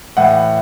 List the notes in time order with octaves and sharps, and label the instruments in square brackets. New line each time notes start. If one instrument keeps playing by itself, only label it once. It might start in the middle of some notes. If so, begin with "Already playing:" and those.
[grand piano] A2 E3 F#5